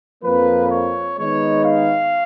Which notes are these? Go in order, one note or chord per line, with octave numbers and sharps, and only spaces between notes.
F2 F3 A#3 B4
C#5
D#3 G#3 B3 D#4 C#5
F5